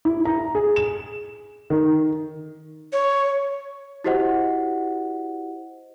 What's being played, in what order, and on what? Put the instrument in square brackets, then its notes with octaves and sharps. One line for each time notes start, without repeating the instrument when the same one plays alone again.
[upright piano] E4
A#5
G#4
E7
D#3
[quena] C#5
[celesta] E4 F#4 G4 C5 D#5 F#5